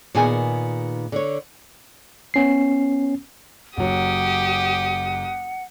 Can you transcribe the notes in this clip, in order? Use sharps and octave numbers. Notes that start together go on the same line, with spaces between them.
A#2 D#3 B3 G#4 G#5
D3 C#5
B3 C#4 C7
F#1 F#3 G4 F#5 D#6